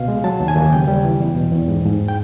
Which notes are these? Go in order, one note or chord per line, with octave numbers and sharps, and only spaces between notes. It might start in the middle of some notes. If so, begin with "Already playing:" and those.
Already playing: C#2 B2 F5
G#3
F#3 A5
D#2
G#5
D#2
C#3 G5
G3
E3
E2
B2
E2
G#2
G#2
G5